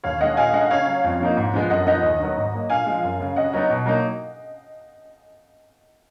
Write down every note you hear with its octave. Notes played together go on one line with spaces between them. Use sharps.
D#2 C#5 F5
D#3 G#3 C#4 D#5 F#5
A#2 F5 G#5
G#3 D#4 D#5 F#5
C#3 C#5 F5
F#3 C#4
F2
F3 A#3 D#4
G#2
F3 G#3 B3
F#2 D#5 F#5
F3 B3 D#4 D#5 F#5
D#2
D#3 F#3 B3
G#2
F#3 A#3
A#2 F5 G#5
F3 G#3
F#2
C#3 F#3
C#3 D#5 F#5
F#3 B3 D#4
B2
F#3 A#3 D#4